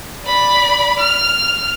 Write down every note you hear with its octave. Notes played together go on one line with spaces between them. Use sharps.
D5 B5
F6